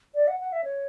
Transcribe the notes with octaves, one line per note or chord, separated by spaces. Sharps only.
D5
F#5
F#5
E5
C#5